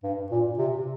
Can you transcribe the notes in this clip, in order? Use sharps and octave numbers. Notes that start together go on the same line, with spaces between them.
G2
A#2
C3